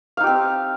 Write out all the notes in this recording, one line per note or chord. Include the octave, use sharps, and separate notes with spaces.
C4 D#4 G4 F5